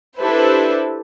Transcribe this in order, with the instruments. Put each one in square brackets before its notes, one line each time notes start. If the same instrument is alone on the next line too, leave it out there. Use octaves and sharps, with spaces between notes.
[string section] D4 E4 G4 A4 B4 C5